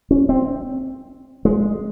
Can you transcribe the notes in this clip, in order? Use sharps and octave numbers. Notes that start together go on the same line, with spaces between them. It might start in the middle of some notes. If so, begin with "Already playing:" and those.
C#4
C4
G#3